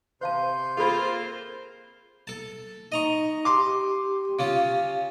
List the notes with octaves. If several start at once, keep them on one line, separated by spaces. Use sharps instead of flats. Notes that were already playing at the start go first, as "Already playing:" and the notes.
C3 C5 F5 A5 C6 G6
A#3 C4 F4 G#4 A4 C5 B5
A4 A5
D#4 D#5 A#5 C#6
G4 C6 D6
C#3 C#4 F4